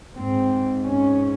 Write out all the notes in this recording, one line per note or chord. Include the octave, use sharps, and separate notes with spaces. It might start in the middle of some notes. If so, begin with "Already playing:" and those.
G#2 C4
C#4